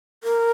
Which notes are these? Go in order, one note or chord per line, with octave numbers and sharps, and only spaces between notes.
A#4